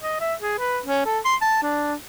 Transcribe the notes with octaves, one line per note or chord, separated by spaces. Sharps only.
D#5
E5
G#4
B4
C#4
A4
C6
A5
D4